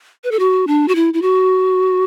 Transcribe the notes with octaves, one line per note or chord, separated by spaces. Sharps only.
B4
A4
F#4
D4
F#4
E4
E4
F#4